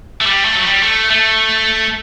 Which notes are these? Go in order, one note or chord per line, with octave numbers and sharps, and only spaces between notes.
A3
G3
A3
F#3
G3
A3
A3